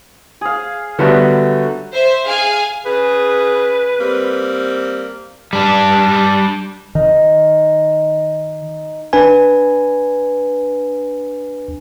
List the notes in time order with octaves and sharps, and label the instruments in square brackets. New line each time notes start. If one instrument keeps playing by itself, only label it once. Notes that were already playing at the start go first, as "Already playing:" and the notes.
[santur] G#4 F5
[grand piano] D3 G3 B3 [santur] F#3 A3 F#4
[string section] C5 E5
G#4 F5 G#5
[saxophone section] C#3 G#4 [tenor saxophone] B4
[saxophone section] G3 A#3 C4
[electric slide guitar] G3 D4
[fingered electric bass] D#3 [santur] D#4
[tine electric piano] D4 B4 G#5